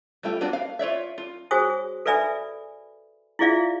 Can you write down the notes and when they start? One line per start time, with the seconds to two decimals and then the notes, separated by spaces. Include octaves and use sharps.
0.23 G3 A3 F4 G5
0.41 B3 D4 F#4 B4 D5
0.53 F5
0.79 F4 C#5 D5 E5
1.18 F4
1.51 F#4 G#4 C5 C#5 G#5 D#6
2.06 A4 B4 D5 E5 G#5 B5
3.39 E4 F4 G#4 D5 E5 F5